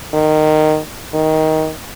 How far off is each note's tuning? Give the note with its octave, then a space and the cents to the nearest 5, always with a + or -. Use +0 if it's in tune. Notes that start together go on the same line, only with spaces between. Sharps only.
D#3 -15
D#3 +15